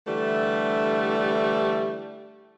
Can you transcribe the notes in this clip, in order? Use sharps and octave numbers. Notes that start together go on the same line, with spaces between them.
D3 E3 G3 A3